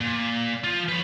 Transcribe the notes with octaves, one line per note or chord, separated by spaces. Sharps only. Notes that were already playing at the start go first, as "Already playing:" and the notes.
A#2
F3 F4
B4 C#5